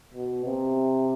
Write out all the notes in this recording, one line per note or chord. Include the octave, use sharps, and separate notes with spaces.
B2
C3